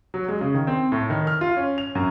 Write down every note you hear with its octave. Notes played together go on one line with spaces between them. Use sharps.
F#3
G#3
C#3
D#3
C4
A2
D#3
F6
F4
C#4
F7
F#2